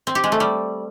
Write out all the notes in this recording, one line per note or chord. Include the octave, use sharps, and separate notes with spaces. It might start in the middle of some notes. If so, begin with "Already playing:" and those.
C4
G4
G#3
A3
G3